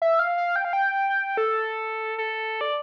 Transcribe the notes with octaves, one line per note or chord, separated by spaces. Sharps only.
E5
F5
F5
G5
F5
G5
G5
A4
A4
D5